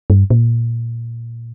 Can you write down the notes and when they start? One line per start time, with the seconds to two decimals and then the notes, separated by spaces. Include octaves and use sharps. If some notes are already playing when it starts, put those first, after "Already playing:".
0.10 G2
0.30 A#2